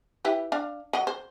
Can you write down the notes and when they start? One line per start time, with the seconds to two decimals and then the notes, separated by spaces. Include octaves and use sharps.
0.25 E4 G4 B4
0.52 D4 F5
0.93 F#3 D#5
1.07 C5